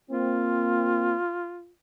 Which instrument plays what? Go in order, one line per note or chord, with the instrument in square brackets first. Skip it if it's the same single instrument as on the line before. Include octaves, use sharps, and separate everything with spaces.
[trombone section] A#3 C4 [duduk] F4